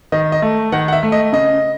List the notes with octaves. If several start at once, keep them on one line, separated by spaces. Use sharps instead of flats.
D#3 D#5
D#5
A3
D#3 F#5
F#5
E5
A3
D#5
C#3 D#5